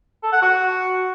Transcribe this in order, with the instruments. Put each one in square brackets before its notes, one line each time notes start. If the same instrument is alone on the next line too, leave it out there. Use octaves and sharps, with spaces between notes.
[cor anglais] A4
F#5
F#4